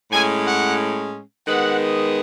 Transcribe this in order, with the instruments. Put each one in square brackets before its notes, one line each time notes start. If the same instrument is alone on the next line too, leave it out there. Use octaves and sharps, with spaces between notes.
[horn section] A2 G#3 C#4 G#5
F#5
D#3 G#3 B3 F#5